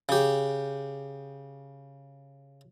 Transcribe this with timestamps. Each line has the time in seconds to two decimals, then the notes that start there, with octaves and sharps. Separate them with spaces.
0.09 C#3 G4